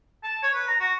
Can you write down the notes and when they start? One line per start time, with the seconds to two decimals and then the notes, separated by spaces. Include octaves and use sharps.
0.24 A5
0.43 C#5
0.54 B4
0.68 A#5
0.80 F#4